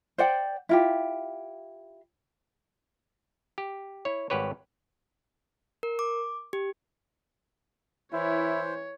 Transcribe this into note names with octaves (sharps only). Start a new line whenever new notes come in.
C5 D5 F#5 G5
E4 F4 G4
G4
E4 C#5
G#1 G3 G4 B4 C#5
A#4
D6
G4
E3 E4 C5 C#5